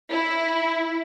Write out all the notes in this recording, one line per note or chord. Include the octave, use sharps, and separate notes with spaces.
E4